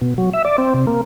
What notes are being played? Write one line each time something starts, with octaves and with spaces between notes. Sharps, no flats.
B2
F#3
E5
D5
C4
C3
A#3